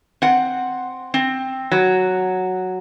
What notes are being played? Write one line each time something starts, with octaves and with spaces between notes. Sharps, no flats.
C4 F#5
C4
F#3